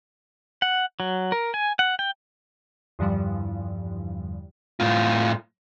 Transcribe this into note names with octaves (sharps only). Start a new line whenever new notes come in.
F#5
F#3
A#4
G#5
F#5
G5
E2 G2 D3 F3 G3
A2 F4